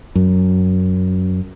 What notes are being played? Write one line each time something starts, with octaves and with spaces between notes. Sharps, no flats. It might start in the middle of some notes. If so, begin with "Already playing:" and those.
F#2